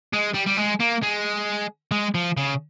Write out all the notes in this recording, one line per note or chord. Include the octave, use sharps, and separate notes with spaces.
G#3
G3
G3
G#3
A#3
G#3
G#3
F3
C#3